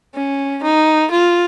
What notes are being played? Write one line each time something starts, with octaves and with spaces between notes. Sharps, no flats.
C#4
D#4
F4